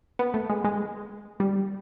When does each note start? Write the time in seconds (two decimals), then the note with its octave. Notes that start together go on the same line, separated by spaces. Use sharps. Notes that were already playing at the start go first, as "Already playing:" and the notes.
0.19 B3
0.34 A3
0.50 G#3
0.64 G#3
1.40 G3